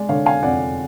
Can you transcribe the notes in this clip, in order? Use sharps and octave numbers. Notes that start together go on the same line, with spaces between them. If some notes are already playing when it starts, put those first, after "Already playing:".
Already playing: G#3 D5
D3 C#5 F5
F5 G#5
F2 D5 F#5